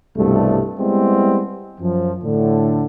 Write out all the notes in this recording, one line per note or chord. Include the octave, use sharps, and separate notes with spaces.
C2 G2 B2 A3
G3 G#3 B3 C4 E4
F#2 F3
A2 D3